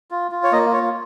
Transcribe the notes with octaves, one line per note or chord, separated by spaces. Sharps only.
F4
F4
C#5
A#3 D#5
F4 C#5